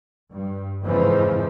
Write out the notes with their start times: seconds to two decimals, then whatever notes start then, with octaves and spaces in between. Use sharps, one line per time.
0.31 G2
0.83 F2 G#2 C#3 E3 F3